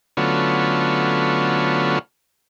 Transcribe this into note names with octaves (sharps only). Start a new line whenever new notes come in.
D3 F#3 A3 B3 C#4 F4